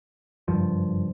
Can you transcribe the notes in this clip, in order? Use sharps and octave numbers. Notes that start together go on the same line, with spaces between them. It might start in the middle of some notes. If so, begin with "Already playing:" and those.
F#1 G2 F3